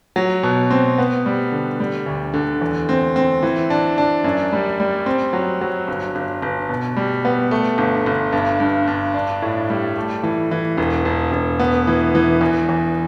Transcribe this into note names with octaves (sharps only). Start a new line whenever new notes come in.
F#3
B2
C4
B3
G3
D3
G3
D2
D3
E2
C4
C4
E3
D4
D4
F#2
G3
G3
C4
F#3
F#3
G1
G1
G1
B2
G3
B3
A3
G1
G1
G2
G2
G2
D4
A2
G3
A3
E3
E3
E1
E1
E1
B3
E3
E3
E2
E2